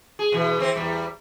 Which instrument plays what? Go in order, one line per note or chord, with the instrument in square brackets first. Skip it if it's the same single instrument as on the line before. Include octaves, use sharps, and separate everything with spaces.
[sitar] G#4
B2 E3
E3 C4 C5
E2 G3